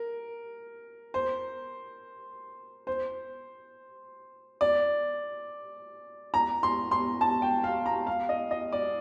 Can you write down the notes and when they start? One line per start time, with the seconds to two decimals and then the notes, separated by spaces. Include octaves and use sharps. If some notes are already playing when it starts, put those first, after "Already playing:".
Already playing: A#4
1.14 C5
2.87 C5
4.61 D5
6.34 A#5
6.63 C6
6.91 C6
7.21 A5
7.42 G5
7.64 F5
7.86 A#5
8.07 F5
8.29 D#5
8.51 D#5
8.73 D5